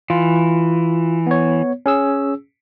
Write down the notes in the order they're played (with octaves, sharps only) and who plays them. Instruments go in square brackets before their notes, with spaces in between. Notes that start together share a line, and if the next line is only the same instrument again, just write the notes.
[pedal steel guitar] E3 [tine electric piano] F4
[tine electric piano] B3 C#5
C#4 G#4 E6